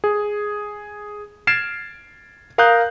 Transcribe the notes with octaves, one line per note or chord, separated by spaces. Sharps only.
G#4
F6 G#6 A6 C7 D7 E7
A#4 F5 A#5 D#6 F#6 G6